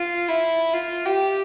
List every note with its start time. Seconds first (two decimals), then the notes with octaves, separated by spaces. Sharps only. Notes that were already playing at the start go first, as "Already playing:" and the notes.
Already playing: F4
0.28 E4
0.74 F4
1.06 G4